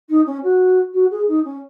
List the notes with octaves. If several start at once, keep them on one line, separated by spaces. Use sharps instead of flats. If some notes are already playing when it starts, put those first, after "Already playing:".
D#4
C#4
F#4
F#4
G#4
D#4
C#4